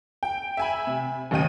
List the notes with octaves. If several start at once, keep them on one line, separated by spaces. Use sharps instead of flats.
G5
E5 G#5 B5
C3
A1 D#2 C#3 D#5 G5 D#7